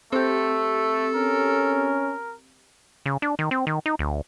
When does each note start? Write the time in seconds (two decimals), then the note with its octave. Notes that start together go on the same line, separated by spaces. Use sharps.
0.13 A3 C4 G4 A4
1.15 C#4 A#4
3.06 C#3
3.22 D4
3.39 D#3
3.51 C4
3.67 D#3
3.86 D#4
3.99 D2